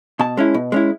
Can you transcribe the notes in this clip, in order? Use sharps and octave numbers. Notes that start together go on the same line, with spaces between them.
B2 A5
G#3 C#4 E4
B2
G#3 C#4 E4